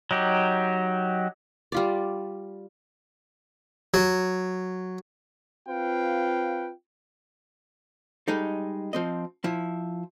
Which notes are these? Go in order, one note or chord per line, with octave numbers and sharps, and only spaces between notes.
F#3 D#4 G4
G3 F4 D5
F#3
C4 F4 B4 F5 G5
G3 G#3 D#4 A4
F3 C4 D#5
F3 E4